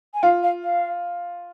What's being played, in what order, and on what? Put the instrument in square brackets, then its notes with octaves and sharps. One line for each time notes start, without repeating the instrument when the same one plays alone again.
[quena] G#5
[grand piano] F4 [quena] F5
[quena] F5
F5